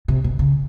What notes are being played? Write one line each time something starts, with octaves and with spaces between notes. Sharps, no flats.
C3
B2
C#3